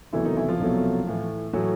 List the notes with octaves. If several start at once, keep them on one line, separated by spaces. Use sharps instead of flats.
C2 B2 E3 F#3 A3 E4
D#3 D#4
E3 E4
F3 F4
C2 B2 F#3 A3
A2 E3 A3
A2 E3 F#3 A3 F#4